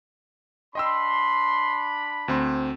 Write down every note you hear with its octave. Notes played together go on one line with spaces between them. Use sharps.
D4 D#5 G5 B5 C6 E6
D2 C4 C6